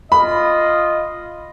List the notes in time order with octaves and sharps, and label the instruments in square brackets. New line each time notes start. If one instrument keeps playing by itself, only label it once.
[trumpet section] F4 D#5 [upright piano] B5